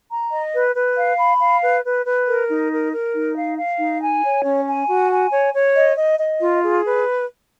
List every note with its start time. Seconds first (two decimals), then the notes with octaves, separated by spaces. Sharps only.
0.10 A#5
0.32 D#5
0.53 B4
0.75 B4
0.97 F5
1.18 B5
1.41 F5
1.62 B4
1.84 B4
2.06 B4
2.27 A#4
2.49 D#4
2.71 A#4
2.92 A#4
3.14 D#4
3.36 F5
3.58 F5
3.79 D#4
4.02 G#5
4.23 C#5
4.44 C#4
4.67 G#5
4.88 F#4
5.10 G#5
5.31 C#5
5.54 C#5
5.75 D#5
5.97 D#5
6.19 D#5
6.40 F4
6.62 G#4
6.84 B4